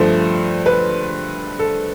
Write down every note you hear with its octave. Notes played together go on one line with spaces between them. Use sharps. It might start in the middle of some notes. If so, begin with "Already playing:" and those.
Already playing: G2 F3 A3 A4 C5
B4
A4